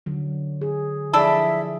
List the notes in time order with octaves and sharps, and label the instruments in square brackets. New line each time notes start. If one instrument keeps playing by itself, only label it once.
[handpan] D3 F#3
G#4
[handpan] F3 G#4 [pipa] D4 E4 A4 [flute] E5